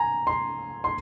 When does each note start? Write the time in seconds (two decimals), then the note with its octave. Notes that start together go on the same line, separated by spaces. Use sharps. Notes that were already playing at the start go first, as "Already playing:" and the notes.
Already playing: G#5 A#5
0.27 C6
0.84 C6